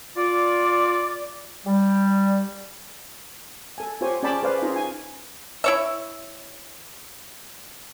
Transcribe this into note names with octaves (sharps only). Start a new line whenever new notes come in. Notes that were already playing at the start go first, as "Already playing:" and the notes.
F4 D5
G3
A4 G#5
F4 G4 C5 C#5 G#5
C#4 G#4 D5 G5 A5 B5
G#4 B4 C5 D5 F5
C#4 D#4 F4 G#4 A#5
G#5
E4 C#5 E5